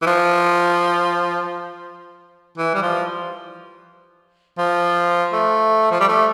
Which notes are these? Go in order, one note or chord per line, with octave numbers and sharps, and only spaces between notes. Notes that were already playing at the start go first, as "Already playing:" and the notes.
E3
F3
E3
G3
F3
F3
A3
F3
G3
A3